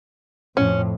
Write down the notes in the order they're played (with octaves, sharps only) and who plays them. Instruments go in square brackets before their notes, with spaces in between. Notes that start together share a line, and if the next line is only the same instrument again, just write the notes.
[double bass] F2 A2 [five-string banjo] C#4